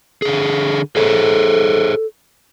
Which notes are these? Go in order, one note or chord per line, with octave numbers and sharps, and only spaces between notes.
D3 G#4
G#4 A4 C5 C#5